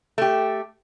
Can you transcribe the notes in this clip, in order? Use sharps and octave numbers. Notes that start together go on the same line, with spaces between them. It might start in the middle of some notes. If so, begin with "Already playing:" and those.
A3 G4